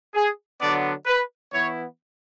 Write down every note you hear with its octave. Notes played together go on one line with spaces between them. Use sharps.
G#4
D3 F#3 B3 D4 D5
B4
E3 B3 E4 C#5